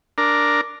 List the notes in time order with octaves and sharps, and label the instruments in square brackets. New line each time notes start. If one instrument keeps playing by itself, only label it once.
[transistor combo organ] D4 A#4